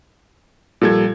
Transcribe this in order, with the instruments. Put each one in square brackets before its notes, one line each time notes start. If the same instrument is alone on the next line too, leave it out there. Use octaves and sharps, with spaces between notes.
[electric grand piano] A#2 A4 G#6 [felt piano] F3 G3